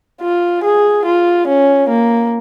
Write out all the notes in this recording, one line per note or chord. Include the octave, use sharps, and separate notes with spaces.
F4
G#4
F4
C#4
A#3